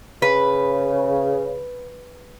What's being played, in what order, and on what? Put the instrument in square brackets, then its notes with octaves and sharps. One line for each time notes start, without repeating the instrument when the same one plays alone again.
[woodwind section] C#3 [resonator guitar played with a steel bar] B4